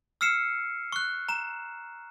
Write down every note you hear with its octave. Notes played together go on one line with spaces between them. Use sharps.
E6 F6 C7 C#7 E7
C#6 F#6
A#5 E7